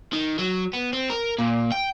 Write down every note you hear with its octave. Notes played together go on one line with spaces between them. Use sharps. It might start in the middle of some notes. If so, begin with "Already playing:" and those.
D#3
F#3
B3
C4
A#4
A#2
G5